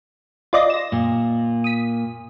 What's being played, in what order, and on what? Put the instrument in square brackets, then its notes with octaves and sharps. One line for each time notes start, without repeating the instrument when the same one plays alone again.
[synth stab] F4 D5 D#5
A#6 E7
[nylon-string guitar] A#2
[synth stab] D#6 B6